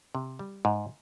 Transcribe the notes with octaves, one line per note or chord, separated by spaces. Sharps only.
C3
G3
G#2